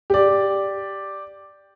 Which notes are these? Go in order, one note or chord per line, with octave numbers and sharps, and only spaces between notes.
G4 D5